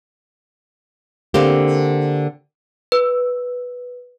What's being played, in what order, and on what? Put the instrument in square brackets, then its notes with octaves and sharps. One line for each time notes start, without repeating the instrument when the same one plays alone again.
[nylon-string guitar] D3 A#3 C4 G4
[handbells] B4